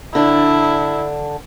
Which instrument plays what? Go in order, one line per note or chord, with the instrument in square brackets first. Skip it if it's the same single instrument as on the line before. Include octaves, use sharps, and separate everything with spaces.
[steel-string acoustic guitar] D3 D4 [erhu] E4